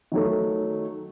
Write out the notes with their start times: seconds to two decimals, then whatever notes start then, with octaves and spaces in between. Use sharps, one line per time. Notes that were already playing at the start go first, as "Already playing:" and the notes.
0.12 D#3 F#3 A3